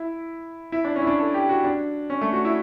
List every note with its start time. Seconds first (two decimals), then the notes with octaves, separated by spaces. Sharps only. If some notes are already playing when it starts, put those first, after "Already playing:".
Already playing: E4
0.72 E4
0.85 D4
0.96 C#4
1.02 E4
1.07 D4
1.19 A4
1.34 G4
1.49 F#4
1.64 D4
2.10 C#4
2.21 A3
2.33 F#4
2.45 E4